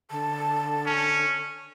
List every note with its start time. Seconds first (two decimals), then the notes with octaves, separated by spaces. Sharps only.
0.11 D3 A5
0.86 C#4